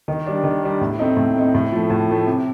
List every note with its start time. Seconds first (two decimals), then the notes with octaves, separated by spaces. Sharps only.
0.08 D#3
0.26 G3 D4
0.44 D#3
0.63 G3 D4
0.81 A2
0.99 A3 C4 D#4
1.17 A2
1.35 A3 C4 D#4
1.55 A2
1.72 F3 A3
1.90 A2
2.09 F3 A3
2.27 C3